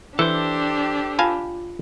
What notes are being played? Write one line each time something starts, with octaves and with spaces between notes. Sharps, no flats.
E3 D4 G4 A4 C5
F4 F5 G#5 A5